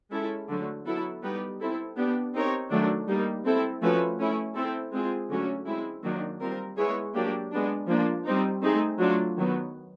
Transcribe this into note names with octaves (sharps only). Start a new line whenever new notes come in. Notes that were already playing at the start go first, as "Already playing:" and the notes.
G#3 C#4 E4 A4
D3 F#3 A3
F#3 B3 E4 A4
G3 B3 D#4 G4 B4
C4 E4 A4
B3 D4 G4
C4 D#4 G4 A#4 C#5
D#3 F#3 A3 D4
G3 A#3 D#4
C4 E4 A4
F3 A3 C#4 F#4 B4
A3 C#4 E4
C4 E4 A4
G#3 C4 F4 G#4
D3 F#3 A3 C#4 F#4
G#3 C4 E4
D#3 F#3 A#3 D4 F#4
G3 C4 F4 A#4
G#3 B3 E4 G#4 C#5
F#3 A#3 D4 G4
G#3 B3 D4
F3 A#3 D4
G3 C4 D#4
A3 C4 D#4 G#4
F#3 A3 D4 F4
D#3 F#3 B3